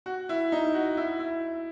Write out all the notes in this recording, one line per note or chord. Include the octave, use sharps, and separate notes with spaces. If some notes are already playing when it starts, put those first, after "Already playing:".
F#4
E4
D#4
F#4
E4
E4